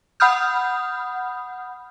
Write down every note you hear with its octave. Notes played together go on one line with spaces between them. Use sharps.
F#5 B5 D#6 F6 G6